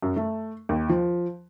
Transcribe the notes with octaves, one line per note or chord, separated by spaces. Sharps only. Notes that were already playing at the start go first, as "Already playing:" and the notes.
F#2
A3
D#2
F3